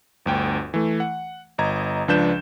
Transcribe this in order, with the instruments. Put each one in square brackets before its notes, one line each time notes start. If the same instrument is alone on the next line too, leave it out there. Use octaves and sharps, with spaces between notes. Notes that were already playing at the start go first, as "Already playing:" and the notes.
[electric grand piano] G1 D2 G5
E3 A3
F#5
G1 D#5 A#5 G#6
C#2 F3 D4 B4 G6 E7